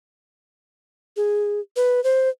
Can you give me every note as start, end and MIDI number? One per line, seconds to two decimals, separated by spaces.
1.17 1.60 68
1.76 2.03 71
2.04 2.29 72